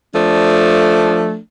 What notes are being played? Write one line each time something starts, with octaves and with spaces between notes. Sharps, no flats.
F3 A3 D4